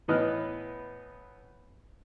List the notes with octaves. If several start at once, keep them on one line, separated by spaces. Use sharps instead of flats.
A2 E3 B3 D#5 F6 F#6